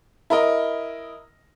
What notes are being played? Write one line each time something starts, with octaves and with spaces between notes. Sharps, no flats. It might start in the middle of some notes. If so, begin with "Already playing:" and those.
E4 A#4 D#5